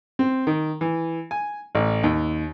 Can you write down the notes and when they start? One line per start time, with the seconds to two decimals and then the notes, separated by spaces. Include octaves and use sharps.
0.19 C4
0.47 D#3
0.81 E3
1.31 G#5
1.75 A1
2.04 D#2